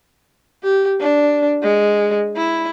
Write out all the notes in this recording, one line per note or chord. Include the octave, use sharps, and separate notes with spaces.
G4
D4
G#3
E4